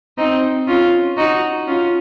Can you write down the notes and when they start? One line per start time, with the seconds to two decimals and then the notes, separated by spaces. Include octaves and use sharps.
0.18 C4 D#4
0.67 C#4 F4
1.17 D#4 F#4
1.67 C#4 F4